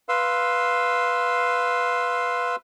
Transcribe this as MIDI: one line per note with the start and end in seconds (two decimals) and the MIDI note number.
0.09 2.56 71
0.09 2.56 77
0.09 2.56 84
0.09 2.56 88